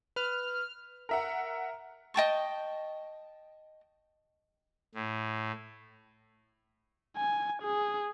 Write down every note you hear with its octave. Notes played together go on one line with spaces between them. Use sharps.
B4 F6
A#4 E5 F#5
D#5 G5 A5 C#6
A2
G#5
G#4